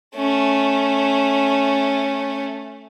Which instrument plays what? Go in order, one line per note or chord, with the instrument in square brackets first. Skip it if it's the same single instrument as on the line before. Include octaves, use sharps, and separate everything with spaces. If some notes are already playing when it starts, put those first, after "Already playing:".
[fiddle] A3 C#4